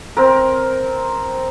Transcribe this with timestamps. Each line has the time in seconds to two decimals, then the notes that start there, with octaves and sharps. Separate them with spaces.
0.17 C4 A#4